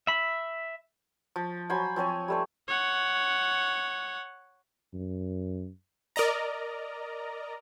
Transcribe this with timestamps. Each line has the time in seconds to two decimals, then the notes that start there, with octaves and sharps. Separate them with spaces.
0.07 E5 B5
1.36 F3
1.70 F#3 C5 G#5 B5
1.96 F3 C4 C#5 G#5
2.28 G3 A3 C5
2.68 C#5 F#5
4.94 F#2
6.16 A#4 D5 D#5 A#5